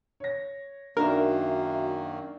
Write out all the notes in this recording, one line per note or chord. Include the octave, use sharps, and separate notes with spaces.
C#5 A#6
F#2 D#3 A#3 D4 D#4 F#4 A#4 E5